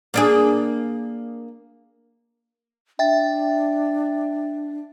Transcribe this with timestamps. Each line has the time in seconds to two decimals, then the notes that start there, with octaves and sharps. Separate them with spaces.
0.14 A#3 D4 G#4
2.99 D4 E5 G5 A6